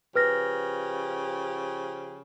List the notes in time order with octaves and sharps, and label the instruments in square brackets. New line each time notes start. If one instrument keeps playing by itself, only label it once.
[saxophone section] C#3 F3 G4 [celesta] B4 F6 A#6